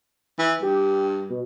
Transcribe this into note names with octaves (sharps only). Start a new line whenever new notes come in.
E3
G2 G4
B2